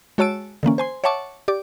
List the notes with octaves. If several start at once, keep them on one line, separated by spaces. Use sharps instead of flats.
G#3 F#4 C#5 A5 E6 D7
D3 E3 A#3 C#4
C5 G#5 C6
C#5 E5 F#5 A5 C#6 D6
G4 D5 D6